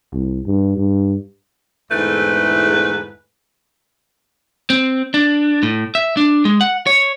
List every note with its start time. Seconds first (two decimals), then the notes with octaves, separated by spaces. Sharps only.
0.13 C2
0.46 G2
0.77 G2
1.91 E2 G#2 D3 A3 E4 B4
4.70 C4
5.14 D4
5.63 A2
5.95 E5
6.17 D4
6.45 G#3
6.61 F#5
6.87 C#5